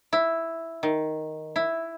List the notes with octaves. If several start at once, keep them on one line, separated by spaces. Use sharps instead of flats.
E4
D#3
E4